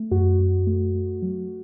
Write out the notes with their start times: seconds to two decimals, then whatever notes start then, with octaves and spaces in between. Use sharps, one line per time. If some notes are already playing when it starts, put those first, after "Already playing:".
Already playing: A3
0.11 F#2 F#4
0.39 F#2
0.67 A3
0.95 A3
1.22 F#3